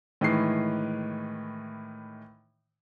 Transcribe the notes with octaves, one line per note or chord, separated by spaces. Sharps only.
A2 D#3 E3 G#3 C7